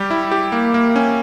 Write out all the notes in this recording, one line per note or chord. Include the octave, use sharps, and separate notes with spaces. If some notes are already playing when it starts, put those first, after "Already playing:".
Already playing: G3 G4
E4
G4
A#3
A#3
C#4